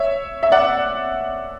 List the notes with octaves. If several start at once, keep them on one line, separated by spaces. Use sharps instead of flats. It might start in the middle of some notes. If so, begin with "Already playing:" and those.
Already playing: C#5 E5
E5
D5 F#5